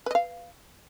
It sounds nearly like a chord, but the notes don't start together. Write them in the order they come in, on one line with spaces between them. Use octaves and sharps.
B4 D#5 F5